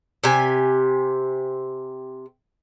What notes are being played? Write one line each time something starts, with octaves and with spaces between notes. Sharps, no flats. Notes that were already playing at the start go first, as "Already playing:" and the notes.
C3 G4 G#5